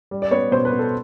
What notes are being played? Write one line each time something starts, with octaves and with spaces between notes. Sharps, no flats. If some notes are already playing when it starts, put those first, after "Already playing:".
G3
D5
B3 C#5
B2 C5
B4
B3
A4